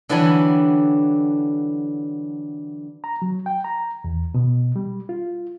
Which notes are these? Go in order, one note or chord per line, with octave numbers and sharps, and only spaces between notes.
D3 E3 F#3 G3 D4 G#5
A#5
F#3
G5
A#5
E2
B2
G3
F4